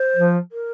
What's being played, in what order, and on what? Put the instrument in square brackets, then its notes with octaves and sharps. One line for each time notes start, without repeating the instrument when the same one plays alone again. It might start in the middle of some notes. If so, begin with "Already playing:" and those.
Already playing: [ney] C5
[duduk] F3
[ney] A#4